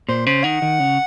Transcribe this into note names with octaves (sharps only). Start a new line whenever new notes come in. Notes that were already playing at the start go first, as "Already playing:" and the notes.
A#2 C5
C#3 C5
D#3 F#5
D#3
C#3